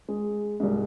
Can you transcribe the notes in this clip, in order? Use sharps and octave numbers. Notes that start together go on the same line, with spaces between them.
G#3
C2 G#2